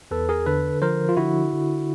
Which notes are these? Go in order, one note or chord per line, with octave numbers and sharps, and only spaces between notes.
E2 A4 B4
G#4 A#4
D3 A4 B4
F3 A#4 C5
F4
D3 E4 F#4
D3